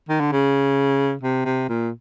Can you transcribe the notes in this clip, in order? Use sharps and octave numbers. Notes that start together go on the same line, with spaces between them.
D#3
D3
C#3
C3
C3
A#2